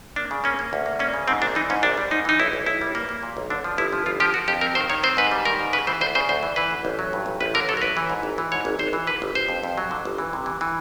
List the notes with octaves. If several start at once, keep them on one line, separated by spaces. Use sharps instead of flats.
A#3 D4
C#3
A#3 C#4
A#3
D2
A#3
A#3 C#4
C#3
G#2 C4
A#1 D4
E3 D#4
G#2 C#4
A#1 D4
G3
G#2 D#4
E3 D#4
B1 E4
B1
B1 E4
G3
A#3
A#3
A#2
B1
D3 D4
F3
G1 E4
F3
G1 F4
F3 G4
F3 F#4
F2 G4
C4 A#4
D#3 C5
D#3 C#5
C4 C5
G#2 B4
G3
D#3 A#4
G#2
C#3 B4
E3 C5
D2 C5
C#3 C5
D2 C5
E3
E3 B4
D2
A1
F#3
G2
A1
A1 B4
D3 A#4
F#3 A4
A#4
A1 B4
E3
G#2
G#1
E3
G#2 C#5
G#1
G#1 C5
E3
D3 B4
G1
G1 C5
F2
F2
F#3
D3
G1
E3
C3
E3
E3